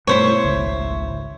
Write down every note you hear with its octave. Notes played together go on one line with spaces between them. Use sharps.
G2 B2 A3 E4 C5 C#5
G#1 C#2